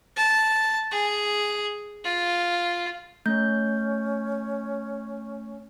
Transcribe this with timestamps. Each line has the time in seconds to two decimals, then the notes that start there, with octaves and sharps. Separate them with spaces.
0.16 A5
0.91 G#4
2.04 F4
3.26 A3 C#4 G6